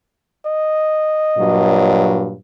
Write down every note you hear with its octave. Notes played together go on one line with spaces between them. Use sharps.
D#5
G2 A#2 F#3